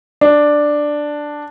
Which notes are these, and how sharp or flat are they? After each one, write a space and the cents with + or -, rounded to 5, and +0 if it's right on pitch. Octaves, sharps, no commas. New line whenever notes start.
D4 +5